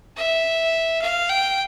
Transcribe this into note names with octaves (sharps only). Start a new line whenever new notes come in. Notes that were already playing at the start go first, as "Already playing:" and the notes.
E5
F5
G5